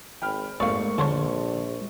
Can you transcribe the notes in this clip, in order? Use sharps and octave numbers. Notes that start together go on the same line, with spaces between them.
G#1 G5 B5 F6
G#1 G#2 A3 A#3 D5 F5 C#6
A#1 D3 C5 C#5 A5